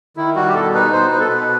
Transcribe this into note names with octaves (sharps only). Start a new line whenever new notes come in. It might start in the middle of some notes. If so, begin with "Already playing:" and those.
D#3 E4
G3 F#4
G4
B2 A4
D#4 B4
B2 C5
B2 B4
A4
B2 B4